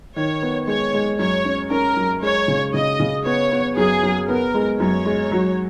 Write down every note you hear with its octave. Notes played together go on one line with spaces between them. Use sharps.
D#3 C#5
B3
G#3 C#5
G#3
F#2 C#5
C#4
C#4 A#4
F#2
G#3 C#5
C#3
C#3 D#5
C#3
B3 C#5
B3
F#2 G#4
F#2
B3 A#4
G#3
F#2 C#5
G#3
F#3